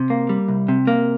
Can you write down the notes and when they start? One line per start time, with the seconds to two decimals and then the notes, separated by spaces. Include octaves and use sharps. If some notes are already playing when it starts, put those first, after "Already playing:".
Already playing: C3
0.10 A#3
0.29 G3
0.48 C2
0.68 C3
0.87 A#3